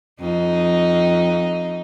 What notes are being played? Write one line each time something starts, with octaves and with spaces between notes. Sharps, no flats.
F2 D#4